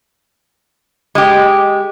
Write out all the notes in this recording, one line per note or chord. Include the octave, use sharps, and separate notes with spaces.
G#3 G4